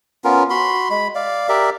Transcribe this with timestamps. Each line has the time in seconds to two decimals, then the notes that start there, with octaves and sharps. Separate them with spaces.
0.24 B3 C#4 F4 A#4
0.50 F#4 B5 C6
0.90 G#3 B5
1.15 D5 F5
1.49 G4 A#4 D5 E5